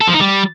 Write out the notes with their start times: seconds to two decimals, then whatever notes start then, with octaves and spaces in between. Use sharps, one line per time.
0.01 A4
0.08 F3
0.14 D#4
0.20 G3